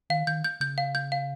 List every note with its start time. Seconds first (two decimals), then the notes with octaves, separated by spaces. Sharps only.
0.10 D#3 F5
0.27 D#3 G6
0.44 G6
0.60 C#3 G6
0.78 F5
0.95 G6
1.12 F5